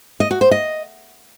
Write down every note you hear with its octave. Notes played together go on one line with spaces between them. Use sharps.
D#5
F#4
C5
D#5